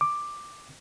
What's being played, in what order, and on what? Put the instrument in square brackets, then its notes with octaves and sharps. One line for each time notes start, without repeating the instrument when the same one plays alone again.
[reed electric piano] D6